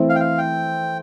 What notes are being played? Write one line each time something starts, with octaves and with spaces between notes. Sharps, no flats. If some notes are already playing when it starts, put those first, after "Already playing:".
Already playing: E3 A3 C4 E4
F5
G5
F5
G5